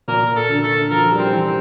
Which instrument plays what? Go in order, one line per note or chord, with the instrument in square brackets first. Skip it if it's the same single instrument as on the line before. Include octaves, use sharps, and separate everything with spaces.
[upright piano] A#2 [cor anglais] A#4
[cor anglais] A4
[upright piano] D3
[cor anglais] A4
[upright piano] F3 [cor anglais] A#4
[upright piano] G3
[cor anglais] C4
[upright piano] E3
[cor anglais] C4